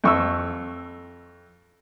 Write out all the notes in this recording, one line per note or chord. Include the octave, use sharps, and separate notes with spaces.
F2 C#6 E6